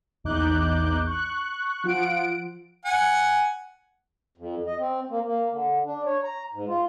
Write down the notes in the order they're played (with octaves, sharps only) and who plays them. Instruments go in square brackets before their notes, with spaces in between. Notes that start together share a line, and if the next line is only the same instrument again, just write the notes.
[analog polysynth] A#1 E2 D#4 D6 F#6 G6
C#6 F#6
F3 F4 F#5 D7
[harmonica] F#5 G#5
[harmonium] F2
D#5
C4
A#3
A#3
D3
D4
C#5
A#5
G#2
F4